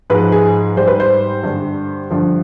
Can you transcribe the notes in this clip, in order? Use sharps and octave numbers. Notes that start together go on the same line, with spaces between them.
G#2 F3 G#3 B4
G#4
G#2 G3 C5
B4
C5
G2 D3 G3
G2 D3 F3